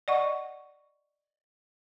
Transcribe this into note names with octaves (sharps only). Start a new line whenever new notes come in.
D5 D#5 F#5 C#6